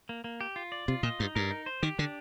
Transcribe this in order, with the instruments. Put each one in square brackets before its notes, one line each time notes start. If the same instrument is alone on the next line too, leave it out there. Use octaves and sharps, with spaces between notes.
[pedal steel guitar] A#3
A#3
G4
F4
D5
[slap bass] C3 [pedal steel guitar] F4
[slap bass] A#2 [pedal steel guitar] D#5
[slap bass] G2 [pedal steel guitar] D#4
[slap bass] G2 [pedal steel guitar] A#4
[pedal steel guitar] D#4
C5
[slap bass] D#3 [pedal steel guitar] G4
[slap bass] D3 [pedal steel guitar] D4